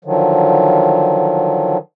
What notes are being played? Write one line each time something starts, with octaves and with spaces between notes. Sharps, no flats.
D3 D#3 F3 F#3